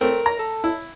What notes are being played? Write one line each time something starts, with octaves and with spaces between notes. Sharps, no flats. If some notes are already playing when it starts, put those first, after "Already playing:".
A3 C4 A#4
A#5
A4
E4